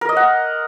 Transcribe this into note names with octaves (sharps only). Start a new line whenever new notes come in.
A#4
D#5
F#5